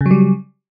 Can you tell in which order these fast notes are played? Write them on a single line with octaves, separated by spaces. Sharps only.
C#3 F#3 G3